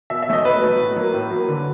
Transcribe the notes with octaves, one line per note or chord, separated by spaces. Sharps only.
B2 E5
E5
F#3 A3 D#5
B2 B4
F#3 A3
A2
F#3 A#3
A2
F#3 A#3
D3